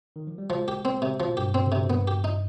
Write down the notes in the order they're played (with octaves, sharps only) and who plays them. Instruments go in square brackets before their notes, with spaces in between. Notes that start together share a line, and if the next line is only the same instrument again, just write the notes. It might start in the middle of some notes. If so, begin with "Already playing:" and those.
[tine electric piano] D#3
F3
G3
[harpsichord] F3 [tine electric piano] G#3
[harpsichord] G4
C4
C3
[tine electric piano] D3 [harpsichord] F3
[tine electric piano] B2
[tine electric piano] G2 [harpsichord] G4
[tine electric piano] B2 [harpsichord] C4
[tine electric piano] C3
D3
[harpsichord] C3
[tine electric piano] B2
[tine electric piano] G2 [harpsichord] B3
[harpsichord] G4
D#4